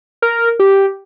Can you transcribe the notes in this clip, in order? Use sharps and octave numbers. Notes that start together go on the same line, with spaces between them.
A#4
G4